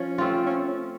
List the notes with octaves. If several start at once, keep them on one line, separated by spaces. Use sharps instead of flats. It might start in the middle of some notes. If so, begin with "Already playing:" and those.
Already playing: F3 C#4
A3 C4 F4
C#4